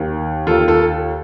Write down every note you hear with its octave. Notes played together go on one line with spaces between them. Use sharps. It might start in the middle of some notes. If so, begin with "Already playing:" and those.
Already playing: D#2 D#3
D#2 D#3 F4 A4
F4 A4